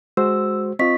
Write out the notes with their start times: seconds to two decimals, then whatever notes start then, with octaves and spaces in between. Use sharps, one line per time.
0.17 G#3 F#4 C5 E6
0.79 C4 F4 D#5 C#6 B6